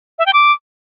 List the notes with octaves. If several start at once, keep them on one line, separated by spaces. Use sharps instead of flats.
E5
G5
D6